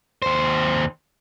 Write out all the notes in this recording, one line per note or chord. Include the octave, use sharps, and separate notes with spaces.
D#2 C5